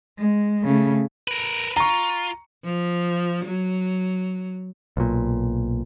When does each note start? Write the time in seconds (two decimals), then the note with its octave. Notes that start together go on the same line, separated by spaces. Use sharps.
0.18 G#3
0.64 C#3 A3
1.28 A#4 B4
1.77 F4 A#5 C#6
2.64 F3
3.45 F#3
4.97 B1 A#2